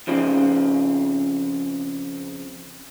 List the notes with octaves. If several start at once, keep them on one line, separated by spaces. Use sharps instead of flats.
F2 C#3 F3